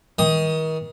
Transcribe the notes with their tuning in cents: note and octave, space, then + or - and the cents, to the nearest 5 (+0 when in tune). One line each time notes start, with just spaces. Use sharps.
D#3 +35 D#6 +10